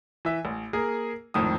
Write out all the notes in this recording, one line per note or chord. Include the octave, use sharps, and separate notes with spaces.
E3 E5
A1
A#3 G#4 A#4
G#1 F2 A2 D#3 D#6